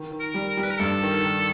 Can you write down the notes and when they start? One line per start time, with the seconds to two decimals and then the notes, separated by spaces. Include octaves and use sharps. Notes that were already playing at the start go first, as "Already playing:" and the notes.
Already playing: D#3
0.11 D#3
0.20 A#4
0.34 G3
0.49 A#4
0.57 G3
0.63 B4
0.71 A#4
0.79 G2 A4
1.02 D#3
1.25 D#3